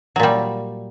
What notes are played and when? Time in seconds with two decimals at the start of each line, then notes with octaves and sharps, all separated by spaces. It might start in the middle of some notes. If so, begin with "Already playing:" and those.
0.16 F#3
0.20 A#2
0.23 G3